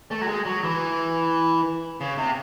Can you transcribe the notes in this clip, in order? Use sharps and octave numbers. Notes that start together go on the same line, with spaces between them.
A3
F#3
G#3
F#3
E3
C#3
C3